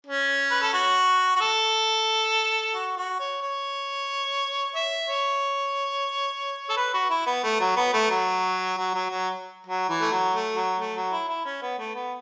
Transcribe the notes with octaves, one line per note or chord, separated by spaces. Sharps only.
C#4
B4
A4
F#4
F#4
A4
F#4
F#4
C#5
C#5
E5
C#5
A4
B4
F#4
E4
B3
A3
F#3
B3
A3
F#3
F#3
F#3
F#3
F#3
E3
A3
F#3
A3
F#3
A3
F#3
E4
E4
C#4
B3
A3
B3